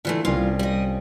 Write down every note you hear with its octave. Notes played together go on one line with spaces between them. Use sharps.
D3 E3 A3 F4
C2 C#4 F4 C7
G3 D#5